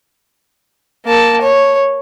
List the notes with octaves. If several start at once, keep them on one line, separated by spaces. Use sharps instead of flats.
A#3 A5
C#5